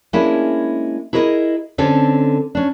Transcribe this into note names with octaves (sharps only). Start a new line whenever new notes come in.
G#3 A#3 C#4 D4 E4
E4 G#4 A#4 C#5 D#5
D3 C4 C#4 A4
C#4 D4